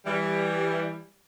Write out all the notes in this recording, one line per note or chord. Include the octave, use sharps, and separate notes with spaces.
E3 G3